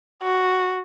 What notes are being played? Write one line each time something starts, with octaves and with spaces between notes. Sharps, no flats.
F#4